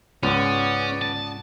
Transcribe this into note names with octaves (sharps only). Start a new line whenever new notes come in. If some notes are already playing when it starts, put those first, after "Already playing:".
C#2 G#2 B3 C#4 D5
A5